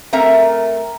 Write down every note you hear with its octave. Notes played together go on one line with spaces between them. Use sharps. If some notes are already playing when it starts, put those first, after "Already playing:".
A3 C4 A#4 E5 A#5